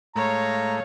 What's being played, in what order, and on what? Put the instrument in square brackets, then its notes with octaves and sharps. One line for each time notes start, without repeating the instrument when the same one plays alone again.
[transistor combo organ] A2 G#3 A3 [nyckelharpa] C#5 F5 [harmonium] A#5